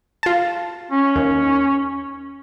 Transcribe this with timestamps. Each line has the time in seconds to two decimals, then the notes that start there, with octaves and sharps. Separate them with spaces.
0.23 F4 A5
0.91 C#4
1.16 D#2